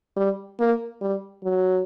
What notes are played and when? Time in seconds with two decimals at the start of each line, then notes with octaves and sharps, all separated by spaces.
0.16 G3
0.59 A#3
1.01 G3
1.44 F#3